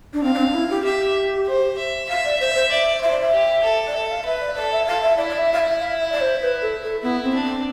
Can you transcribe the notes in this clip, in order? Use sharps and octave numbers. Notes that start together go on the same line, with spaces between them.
D4
C4 F5
D4
C4
D4
E4
G4
G4 E5
C5
E5
E5 F5
D5
C5 E5
C5
D5 E5
C5 E5
D5
E5
G4
A4
D5
A4 E5
F5
B4 E5
D5
A4 D5
E5
A4 F5
E5
E4 D5
D5
E5
F5
E5
F5
E5
D5
C5
B4
A4
A4
B3 E4
C4
D4
C4